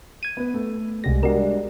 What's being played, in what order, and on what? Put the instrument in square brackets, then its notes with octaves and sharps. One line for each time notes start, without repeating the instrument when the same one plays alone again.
[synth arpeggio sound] G#6 D#7
[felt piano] B3 B4
A3
[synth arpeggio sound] C2 C3 A#6 [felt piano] G3 G#3
[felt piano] G3 G#3 D4 [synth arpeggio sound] F#4 A#4